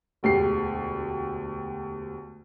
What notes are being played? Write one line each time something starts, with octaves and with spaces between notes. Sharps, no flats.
E1 D2 G4 C7